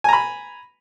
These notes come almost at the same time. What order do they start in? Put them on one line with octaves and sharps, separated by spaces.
G#5 A#5 B5